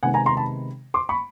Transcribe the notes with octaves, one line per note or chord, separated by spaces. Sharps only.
C3 D#3 G#3 B3 F#5 G#5
G#5 A#5
A#5 C6
A5 B5
C6 D6
B5 C#6